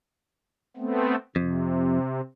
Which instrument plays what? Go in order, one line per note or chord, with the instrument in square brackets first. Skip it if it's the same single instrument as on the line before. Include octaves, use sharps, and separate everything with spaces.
[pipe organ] A3 B3 C4
[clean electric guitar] F2 [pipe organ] C3